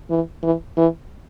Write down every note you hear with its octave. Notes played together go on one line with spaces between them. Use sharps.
E3
E3
E3